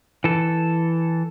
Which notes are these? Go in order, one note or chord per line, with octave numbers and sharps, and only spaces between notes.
E3 A4